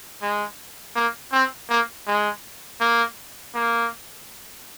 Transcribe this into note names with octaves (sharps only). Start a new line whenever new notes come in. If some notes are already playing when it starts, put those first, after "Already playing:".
G#3
A#3
C4
A#3
G#3
A#3
A#3